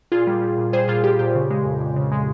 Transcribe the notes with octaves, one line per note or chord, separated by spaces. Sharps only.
A#2 F4 G#4
G3
G3
A#2
G3 G#4 C5
A#2 F4 G#4
G3 G4
A#2 G4
C#3
G#3
F2
F2
C#3
G#3